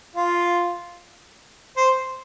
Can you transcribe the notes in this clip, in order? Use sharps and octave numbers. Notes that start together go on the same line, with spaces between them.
F4
C5